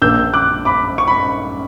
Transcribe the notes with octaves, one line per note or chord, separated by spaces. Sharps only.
A#1 A#2 A#3 E6 G6
D6 F#6
B5 D6
C#6
B5